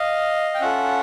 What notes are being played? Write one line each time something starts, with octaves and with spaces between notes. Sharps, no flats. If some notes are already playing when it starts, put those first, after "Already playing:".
Already playing: D#5 F5
G5
C#4 F4 A4 E5 F#5